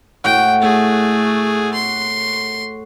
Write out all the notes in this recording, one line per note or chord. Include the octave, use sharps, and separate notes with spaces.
A2 F#4 G5
A3 G#4
C6